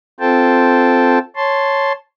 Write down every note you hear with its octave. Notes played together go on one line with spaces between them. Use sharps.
C4 F4 A4 C5 G5 A5
C#5 A5 C6